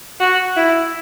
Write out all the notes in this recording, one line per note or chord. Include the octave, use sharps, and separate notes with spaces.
F#4
E4